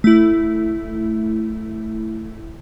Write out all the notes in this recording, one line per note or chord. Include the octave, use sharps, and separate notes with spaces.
A3 E4